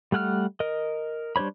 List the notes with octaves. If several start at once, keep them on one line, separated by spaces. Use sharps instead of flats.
G3 A3 F#5 G5 F6
A#4 D#5
G3 D4 C5 C#5 B5